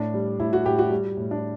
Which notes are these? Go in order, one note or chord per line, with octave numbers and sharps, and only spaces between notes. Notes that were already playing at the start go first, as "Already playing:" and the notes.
Already playing: A2 D4
G3
A2 E4
F#4
A2 G4
F#4
G3
A2
D4